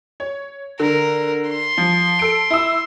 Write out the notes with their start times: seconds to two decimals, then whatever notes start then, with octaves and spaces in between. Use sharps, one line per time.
0.20 C#5
0.80 D3 A#4
1.49 C6
1.78 F3
2.19 A4 D7
2.50 E4 E6